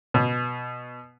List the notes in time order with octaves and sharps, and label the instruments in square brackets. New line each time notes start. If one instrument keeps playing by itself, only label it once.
[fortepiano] B2